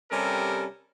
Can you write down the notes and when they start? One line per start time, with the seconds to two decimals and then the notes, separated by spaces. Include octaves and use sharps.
0.11 C3 G3 C#4 A4 A#4